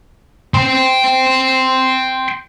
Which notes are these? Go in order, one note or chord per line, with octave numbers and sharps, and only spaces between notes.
G5 C6